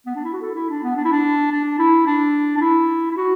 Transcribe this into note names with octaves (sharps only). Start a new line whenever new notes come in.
B3
D4
E4
F#4
A4
E4
D4
B3
D4
E4
D4
D4
E4
D4
D4
E4
E4
F#4